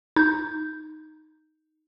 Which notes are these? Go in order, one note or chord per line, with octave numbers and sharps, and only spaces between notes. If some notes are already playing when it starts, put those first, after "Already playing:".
D#4 G6